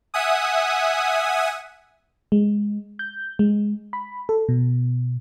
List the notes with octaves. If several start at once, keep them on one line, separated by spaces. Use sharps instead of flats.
E5 F#5 G#5 D#6
G#3
G6
G#3
B5
A4
B2